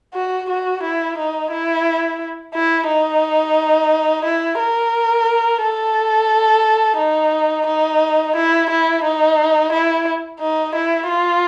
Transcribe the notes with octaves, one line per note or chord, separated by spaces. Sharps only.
F#4
F#4
E4
D#4
E4
E4
D#4
E4
A#4
A4
D#4
D#4
E4
E4
D#4
E4
D#4
E4
F4